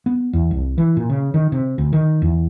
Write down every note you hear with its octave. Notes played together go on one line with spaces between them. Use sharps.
B3
E2
C2
E3
A#2
C#3
D#3
C3
D2
D#3
E2